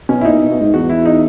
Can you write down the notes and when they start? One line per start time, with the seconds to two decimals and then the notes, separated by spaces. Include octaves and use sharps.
0.09 B2 C#4
0.21 E4
0.25 A#2 D#4
0.38 B2
0.49 B2
0.61 G#2
0.73 E2 F#4
0.90 E4
1.06 D#4